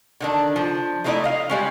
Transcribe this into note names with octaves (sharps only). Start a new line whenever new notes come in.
D3 D#3 D4
F3
G#3 A3 D#4 E4 D5 D#5
D#5 F5
G3 G#3 C#4